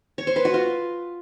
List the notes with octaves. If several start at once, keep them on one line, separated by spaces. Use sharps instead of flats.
C#5
C5
B4
F#4
F4